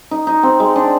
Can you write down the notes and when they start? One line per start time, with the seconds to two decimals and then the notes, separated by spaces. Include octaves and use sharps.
0.11 D#4
0.27 D#4
0.43 C4
0.60 G#3
0.76 D4